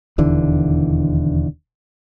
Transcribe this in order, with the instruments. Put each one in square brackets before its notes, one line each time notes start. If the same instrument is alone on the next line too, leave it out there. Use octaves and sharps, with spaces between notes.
[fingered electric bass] E1 D#2 D3 E3